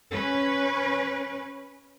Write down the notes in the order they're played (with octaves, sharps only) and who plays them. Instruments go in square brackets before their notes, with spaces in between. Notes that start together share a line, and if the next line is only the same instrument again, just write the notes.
[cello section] C#4 B4